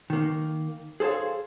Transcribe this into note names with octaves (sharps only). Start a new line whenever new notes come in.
D#3 A#3
G#4 A4 C5 C#5 F5